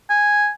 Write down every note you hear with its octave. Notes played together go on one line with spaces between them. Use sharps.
G#5